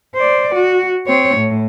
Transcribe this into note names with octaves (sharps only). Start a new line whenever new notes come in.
C5 D5
F#4
C4 C#5
A2